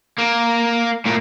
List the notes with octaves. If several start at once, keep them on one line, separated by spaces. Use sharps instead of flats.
A#3
A2 A#3